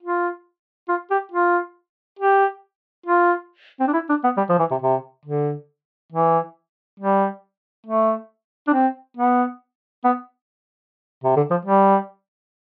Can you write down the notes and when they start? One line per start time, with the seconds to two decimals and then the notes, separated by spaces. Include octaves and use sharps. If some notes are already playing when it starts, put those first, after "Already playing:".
0.02 F4
0.89 F4
1.11 G4
1.32 F4
2.19 G4
3.06 F4
3.80 C4
3.87 D4
3.94 E4
4.09 D4
4.24 B3
4.37 G3
4.49 F3
4.59 E3
4.71 C3
4.82 C3
5.26 D3
6.12 E3
7.00 G3
7.87 A3
8.68 D4
8.73 C4
9.17 B3
10.04 B3
11.24 C3
11.36 D3
11.51 F3
11.65 G3